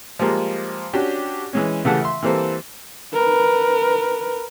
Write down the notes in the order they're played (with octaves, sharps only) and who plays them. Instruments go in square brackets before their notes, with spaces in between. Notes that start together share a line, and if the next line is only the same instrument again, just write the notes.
[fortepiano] F3 G3 G#3 A#3
C#4 D4 F#4 G4
E3 G#3 C#4
C#3 E3 A3 G4 F#5 A5
E5 C6
E3 G3 A#3 C4 A4
[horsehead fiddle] A#4 B4